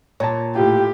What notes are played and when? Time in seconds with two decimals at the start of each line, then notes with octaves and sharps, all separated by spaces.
0.20 A#2 C#5 A5
0.56 A2 F4 G4